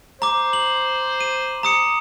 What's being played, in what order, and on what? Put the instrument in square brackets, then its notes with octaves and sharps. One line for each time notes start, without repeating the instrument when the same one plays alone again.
[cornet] C5 [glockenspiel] A#5 D6
[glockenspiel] F#7
D#7
A#5 D#6 C#7